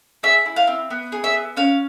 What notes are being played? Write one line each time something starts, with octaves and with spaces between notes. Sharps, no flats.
G#4 E5
E4
F5
C4
B3
G#4
E5
B3
C#4 F5